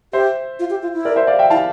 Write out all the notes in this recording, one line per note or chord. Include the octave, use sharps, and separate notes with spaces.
G4 C5 E5
F4
G4
F4
E4
A#4 D5
C5 E5
D5 F5
E5 G5
E4 F5 A5